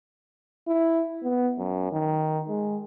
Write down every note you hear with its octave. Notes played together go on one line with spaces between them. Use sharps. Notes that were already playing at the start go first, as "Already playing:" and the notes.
E4
B3
F#2
D#3
G#3